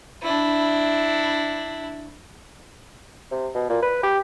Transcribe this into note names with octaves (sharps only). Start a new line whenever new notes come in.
D4 E4
C3
B2
A#2
B4
G4